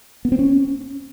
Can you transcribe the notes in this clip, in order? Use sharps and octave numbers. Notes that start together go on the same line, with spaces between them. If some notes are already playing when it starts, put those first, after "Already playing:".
B3
C4
C#4